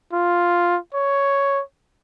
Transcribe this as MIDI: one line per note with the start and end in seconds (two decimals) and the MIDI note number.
0.13 0.78 65
0.94 1.62 73